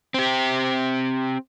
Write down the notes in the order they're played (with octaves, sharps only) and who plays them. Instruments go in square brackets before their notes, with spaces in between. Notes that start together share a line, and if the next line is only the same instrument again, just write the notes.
[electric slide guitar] C4 G4